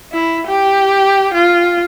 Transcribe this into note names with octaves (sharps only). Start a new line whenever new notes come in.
E4
G4
F4